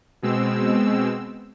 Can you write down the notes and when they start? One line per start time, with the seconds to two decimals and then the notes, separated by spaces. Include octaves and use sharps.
0.22 B2 G#3 C4 E6